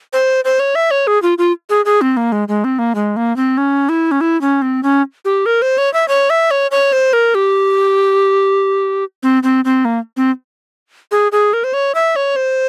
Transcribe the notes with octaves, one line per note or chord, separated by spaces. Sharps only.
C5
C5
C#5
E5
C#5
G#4
F4
F4
G#4
G#4
C4
A#3
G#3
G#3
C4
A#3
G#3
A#3
C4
C#4
E4
C#4
E4
C#4
C4
C#4
G4
A#4
C5
C#5
E5
C#5
E5
C#5
C#5
C5
A#4
G4
C4
C4
C4
A#3
C4
G#4
G#4
A#4
C5
C#5
E5
C#5
C5